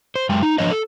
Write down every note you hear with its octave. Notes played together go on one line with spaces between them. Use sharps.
C5
F#2 G#3 G5
D#4
F3 D4 B4 C#5 D#5
A4